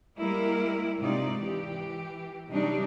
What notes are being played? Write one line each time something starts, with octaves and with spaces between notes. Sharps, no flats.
G3 G#3 A#3 E4 A#4
G#2 C3 G#3 D#4 F4 D5
E3 G4
C3 E3 F#3 G3 D4 D#4